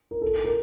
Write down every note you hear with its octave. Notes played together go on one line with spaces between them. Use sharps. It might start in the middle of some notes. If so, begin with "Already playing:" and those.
A#4
A4
A#4